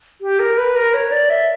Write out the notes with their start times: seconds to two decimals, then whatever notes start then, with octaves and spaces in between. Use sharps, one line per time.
0.21 G4
0.39 A#4
0.58 B4
0.76 A#4
0.94 C#5
1.12 D5
1.30 E5